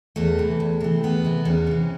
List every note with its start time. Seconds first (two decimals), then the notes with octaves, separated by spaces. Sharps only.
0.16 E2 A3
0.38 C3 E3
0.60 E2
0.81 C3 E3
1.03 E2 B3
1.24 C3 E3
1.45 E2 C#4
1.67 C3 E3